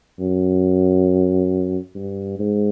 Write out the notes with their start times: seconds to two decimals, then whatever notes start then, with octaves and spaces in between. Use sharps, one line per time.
0.20 F#2
1.95 G2
2.39 G#2